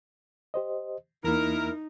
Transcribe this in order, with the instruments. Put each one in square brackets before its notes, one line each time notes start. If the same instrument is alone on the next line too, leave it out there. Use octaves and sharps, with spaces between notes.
[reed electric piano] G4 C5 D#5
[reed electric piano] E2 A#3 [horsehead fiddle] D#4 [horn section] E4 A#4